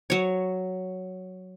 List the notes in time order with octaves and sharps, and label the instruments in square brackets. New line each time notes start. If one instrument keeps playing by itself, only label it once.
[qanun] F#3 C#5